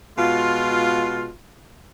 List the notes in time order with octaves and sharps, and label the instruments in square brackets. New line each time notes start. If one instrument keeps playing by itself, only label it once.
[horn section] B2 G#3 F4